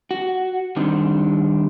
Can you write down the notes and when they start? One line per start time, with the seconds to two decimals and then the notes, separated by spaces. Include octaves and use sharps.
0.11 F#4
0.76 D3 D#3 G3 C4 D4 D#4